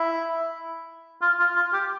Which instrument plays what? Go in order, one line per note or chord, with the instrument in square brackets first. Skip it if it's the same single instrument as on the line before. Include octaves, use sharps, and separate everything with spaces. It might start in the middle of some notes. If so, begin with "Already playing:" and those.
Already playing: [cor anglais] E4
F4
F4
F4
G4